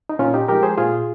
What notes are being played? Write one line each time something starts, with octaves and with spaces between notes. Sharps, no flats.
D#4
A#2 C#4 F4
D#4 G4
F3 G#3 G4 A#4
G#4 C5
A#2 F4 G#4